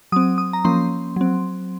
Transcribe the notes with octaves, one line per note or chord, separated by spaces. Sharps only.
F#3 C4 D#6
D#6
A#5
F3 A#3 C#4 C6
F#3 C4